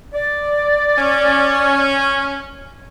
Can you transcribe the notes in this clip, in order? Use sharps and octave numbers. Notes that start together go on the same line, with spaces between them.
D5
C#4